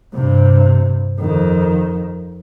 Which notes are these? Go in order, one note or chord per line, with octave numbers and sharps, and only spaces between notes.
G2 C3
F2 D#3